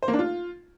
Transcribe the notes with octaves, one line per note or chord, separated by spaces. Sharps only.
C5
A#3
D4
F4